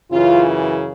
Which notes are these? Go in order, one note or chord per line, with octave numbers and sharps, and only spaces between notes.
F#2 C#3 E3 F4